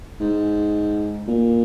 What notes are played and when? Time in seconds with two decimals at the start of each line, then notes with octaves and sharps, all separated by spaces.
0.20 G#2
1.28 A#2